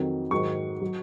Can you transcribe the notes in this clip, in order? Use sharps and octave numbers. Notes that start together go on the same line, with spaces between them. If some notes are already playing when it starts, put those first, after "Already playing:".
Already playing: F2 D#3 F#3
G#2 D#3 F#3 C#6
F#3